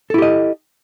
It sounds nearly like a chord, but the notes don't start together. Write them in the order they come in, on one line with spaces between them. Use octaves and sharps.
A4 E4 G4 D#5